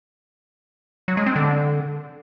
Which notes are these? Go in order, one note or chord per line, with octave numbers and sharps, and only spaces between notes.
F#3
G#3
C4
D3